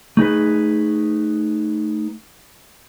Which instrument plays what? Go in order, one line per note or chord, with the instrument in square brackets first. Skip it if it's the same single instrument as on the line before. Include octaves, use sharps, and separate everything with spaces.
[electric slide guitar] A3 D#4 G#4 B4